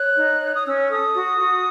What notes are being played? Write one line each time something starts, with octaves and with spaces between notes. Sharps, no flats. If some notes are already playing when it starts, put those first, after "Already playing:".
Already playing: C#5 F#6
D#4
C#5
D#6
C#4 E6
A4 D#6
F#4
F#4